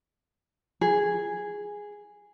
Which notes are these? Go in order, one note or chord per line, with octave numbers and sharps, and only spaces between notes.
G#4